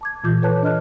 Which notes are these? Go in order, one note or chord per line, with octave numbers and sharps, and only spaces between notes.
A5 D6 G#6
A#2 E3 F4 D6 G6
A4 B4 C#5 A5 F#6
D4 D#5 F6 F#6